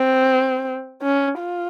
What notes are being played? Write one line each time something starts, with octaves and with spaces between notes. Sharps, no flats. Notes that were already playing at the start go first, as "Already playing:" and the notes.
Already playing: C4
C#4
F4